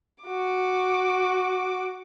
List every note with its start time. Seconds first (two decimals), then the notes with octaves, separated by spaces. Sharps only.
0.24 F#4 D6